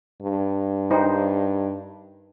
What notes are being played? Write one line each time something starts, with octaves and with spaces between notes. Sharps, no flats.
G2
D#4 C5